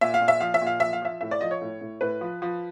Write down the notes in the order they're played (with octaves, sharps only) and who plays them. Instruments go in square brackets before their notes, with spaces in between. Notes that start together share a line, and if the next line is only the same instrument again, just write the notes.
[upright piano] A#2 E5
F5
A#2
E5
F3 F5
E5
A#2
F5
F3 E5
F5
F3 E5
A2 E5
D5
F3 D#5
C#5
A2
A2
A2 B4
F3
F3